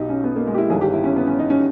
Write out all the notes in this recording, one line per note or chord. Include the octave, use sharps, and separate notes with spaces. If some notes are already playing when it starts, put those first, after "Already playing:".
Already playing: B1 B2 D#4 G4
C#4
B3
A#3
G#3
G4
E4
G1 G2 D#3 G#4
G4
E4
C#4
B3
C#4
D#4
C#4